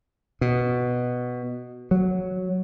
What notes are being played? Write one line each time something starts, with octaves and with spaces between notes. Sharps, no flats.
B2
F#3